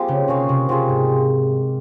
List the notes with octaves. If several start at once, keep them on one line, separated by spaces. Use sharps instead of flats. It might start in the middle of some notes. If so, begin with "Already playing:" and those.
Already playing: F3 G#3 A#3 C4 D#4 G4 C5
C#3
C3 C#4 G#4 C#5 F5
C3
C3 F3 C4 F4 G#4
G#2